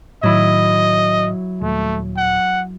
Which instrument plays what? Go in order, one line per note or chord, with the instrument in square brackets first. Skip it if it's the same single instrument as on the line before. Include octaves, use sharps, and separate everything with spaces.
[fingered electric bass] A2 D#3 [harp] F#3 E4 [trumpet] D#5
[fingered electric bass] D#1 [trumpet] A3
[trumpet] F#5